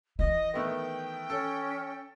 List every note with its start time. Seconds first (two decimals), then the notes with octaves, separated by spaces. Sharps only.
0.19 E3 D#5
0.54 D#3 A3 B3 G5
1.30 C#4 A4